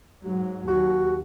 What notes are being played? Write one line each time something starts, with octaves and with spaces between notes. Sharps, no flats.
G#2 F#3
D#2 F#4